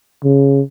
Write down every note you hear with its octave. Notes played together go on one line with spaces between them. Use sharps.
C#3